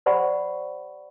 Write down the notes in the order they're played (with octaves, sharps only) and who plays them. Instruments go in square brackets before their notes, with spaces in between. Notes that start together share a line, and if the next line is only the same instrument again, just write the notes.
[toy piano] G4 C5 D5 F#5 B5 C#6